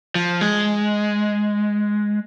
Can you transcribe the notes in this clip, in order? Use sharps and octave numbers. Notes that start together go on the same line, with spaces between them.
F3
G#3